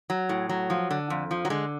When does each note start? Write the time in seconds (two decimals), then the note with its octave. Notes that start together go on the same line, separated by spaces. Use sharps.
0.10 F#3
0.29 A2
0.49 F#3
0.70 F3
0.91 D3
1.10 F2
1.31 F3
1.45 F#3
1.50 D3 G#3